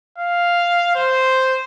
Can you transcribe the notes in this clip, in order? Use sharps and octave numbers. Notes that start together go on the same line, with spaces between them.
F5
C5